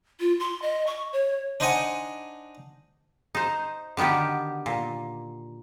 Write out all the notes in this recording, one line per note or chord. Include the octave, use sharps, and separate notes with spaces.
F4
C6
D#5
C#6
C#5
D4 D#4 C5 D#5 F#5 G#5
D#4 C5
D3 D#3 B3 F#4 G4
A#2